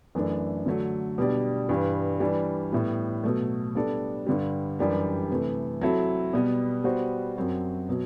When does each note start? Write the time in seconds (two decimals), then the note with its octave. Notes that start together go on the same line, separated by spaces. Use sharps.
0.15 F#2 E3 A3 D4
0.66 D3 F#3 A3
1.18 B2 G3 D4 G4 D5
1.69 G2 E3 G3
2.20 E3 G3 D4
2.72 A2 G3 B3
3.24 B2 F#3 A3
3.75 G3 B3 D4 A4 D5
4.27 G2 D3 G3
4.79 F#2 E3 G3 D4 G4
5.30 C3 E3 A3
5.81 F#3 C4 E4 A4
6.33 B2 G3 B3
6.84 G3 B3 F#4 C5
7.37 F#2 F#3 C4 F#4
7.89 B2 F#3